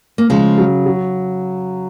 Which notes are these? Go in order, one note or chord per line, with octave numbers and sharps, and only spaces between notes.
A#3
C#3 F3 G#3
F#3
F#3